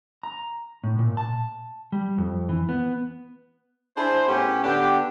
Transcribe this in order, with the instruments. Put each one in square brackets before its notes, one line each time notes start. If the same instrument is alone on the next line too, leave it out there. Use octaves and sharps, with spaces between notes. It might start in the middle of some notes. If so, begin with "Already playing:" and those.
[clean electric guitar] A#5
A2
A#2
A5
G3
F2
E3
B3
[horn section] D4 E4 G#4 C5
A2 B3 C#4 G4
D3 B3 D4 G4